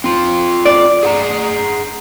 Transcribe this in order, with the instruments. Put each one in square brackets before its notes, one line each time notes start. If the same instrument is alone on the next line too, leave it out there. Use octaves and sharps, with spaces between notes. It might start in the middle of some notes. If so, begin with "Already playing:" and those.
[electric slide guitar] C4 F4
[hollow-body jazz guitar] D5
[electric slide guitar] G#4 F#5 A#5